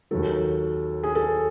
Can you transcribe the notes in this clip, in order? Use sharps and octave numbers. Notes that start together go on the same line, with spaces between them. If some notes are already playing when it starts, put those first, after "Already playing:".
D#2 D#3 F#3 A4
G#4
A4